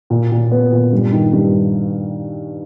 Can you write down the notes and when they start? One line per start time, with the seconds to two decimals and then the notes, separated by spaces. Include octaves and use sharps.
0.10 A#2
0.32 A#2
0.51 B3
0.72 A#2
0.93 G2
1.13 D#3
1.33 G2